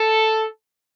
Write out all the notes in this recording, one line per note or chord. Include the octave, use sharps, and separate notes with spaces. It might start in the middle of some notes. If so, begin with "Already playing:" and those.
Already playing: A4